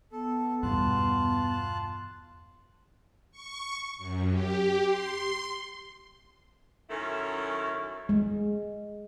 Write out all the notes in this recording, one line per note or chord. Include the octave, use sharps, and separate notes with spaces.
B3 A4
E2 G2 B2 F4 A5 F#6
C#6
F#2
G4
C6
F#2 D#3 C#4 E4 A4
G#3